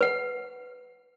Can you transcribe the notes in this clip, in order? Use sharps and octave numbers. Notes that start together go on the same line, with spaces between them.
B4 F#5